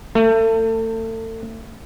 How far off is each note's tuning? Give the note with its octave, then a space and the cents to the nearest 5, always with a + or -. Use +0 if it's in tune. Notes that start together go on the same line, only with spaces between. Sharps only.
A3 +35 A4 +25